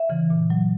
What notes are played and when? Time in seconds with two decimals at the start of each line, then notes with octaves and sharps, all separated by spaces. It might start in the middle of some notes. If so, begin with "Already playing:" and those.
Already playing: E5
0.10 C#3 E3
0.30 A#2
0.50 F#3